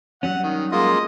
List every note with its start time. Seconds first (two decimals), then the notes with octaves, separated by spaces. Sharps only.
0.23 F#3 G3 C#4 F#5
0.43 D#3
0.72 G#3 A#3 F4 D#5